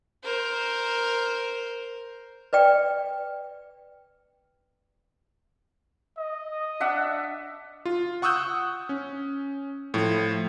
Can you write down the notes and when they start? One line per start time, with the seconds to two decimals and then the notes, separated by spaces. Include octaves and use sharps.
0.24 A#4 C5
2.53 B4 D5 G5
6.18 D#5
6.80 D4 E5 F#5
7.85 F4
8.22 F#5 C#6 D#6 E6 F#6 G6
8.89 C#4
9.94 A2 F3